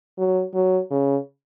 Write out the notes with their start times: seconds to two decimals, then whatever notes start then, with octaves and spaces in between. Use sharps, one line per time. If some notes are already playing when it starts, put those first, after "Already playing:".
0.18 F#3
0.54 F#3
0.91 C#3